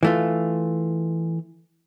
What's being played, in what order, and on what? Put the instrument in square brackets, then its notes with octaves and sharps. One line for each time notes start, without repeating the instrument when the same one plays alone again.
[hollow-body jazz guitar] E3 A3 F4